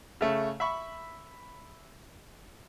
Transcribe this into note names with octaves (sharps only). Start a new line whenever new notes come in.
C#3 A3
E5 B5 C#6